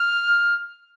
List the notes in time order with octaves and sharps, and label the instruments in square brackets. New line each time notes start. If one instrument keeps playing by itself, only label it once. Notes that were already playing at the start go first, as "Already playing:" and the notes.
Already playing: [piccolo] F6